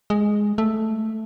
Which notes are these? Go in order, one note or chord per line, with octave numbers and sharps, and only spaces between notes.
G#3
A3